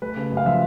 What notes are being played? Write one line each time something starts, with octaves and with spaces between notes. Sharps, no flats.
A3 B4
C#3
F#2
F5
F3 E5